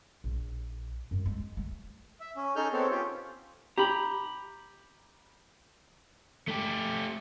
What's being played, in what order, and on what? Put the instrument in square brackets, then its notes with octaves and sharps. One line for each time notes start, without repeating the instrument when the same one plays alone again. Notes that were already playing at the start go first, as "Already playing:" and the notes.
[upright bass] A#1
F#2
G#3
A3
[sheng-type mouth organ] E5
C#4
C#4 D#4 G#4 A4 F6 G6
B3 C4 A4 C#5
C#4 F4 G4
[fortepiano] G4 [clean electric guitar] A#5 B5
[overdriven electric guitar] A3 G4